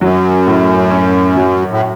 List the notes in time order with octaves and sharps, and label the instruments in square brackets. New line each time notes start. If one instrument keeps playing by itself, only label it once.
[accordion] F#2 [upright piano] F#3
[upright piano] A2
C#4
F#3
[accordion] A2